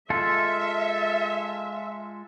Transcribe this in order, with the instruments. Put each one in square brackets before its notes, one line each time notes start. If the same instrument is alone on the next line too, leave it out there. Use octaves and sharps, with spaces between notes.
[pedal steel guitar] G#3 F4 A4 [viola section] E5